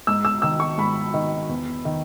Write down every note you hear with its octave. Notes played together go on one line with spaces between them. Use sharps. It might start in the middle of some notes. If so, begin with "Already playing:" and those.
G#2 E6
E6
D#3 E6
C#6
G#2 B5
D#3
E2
D#3